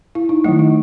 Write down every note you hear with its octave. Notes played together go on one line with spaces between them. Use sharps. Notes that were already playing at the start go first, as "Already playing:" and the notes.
E4
D#4
D#3 F#3 A3 E4
D#4